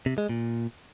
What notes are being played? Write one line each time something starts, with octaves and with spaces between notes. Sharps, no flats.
C3
G#3
A#2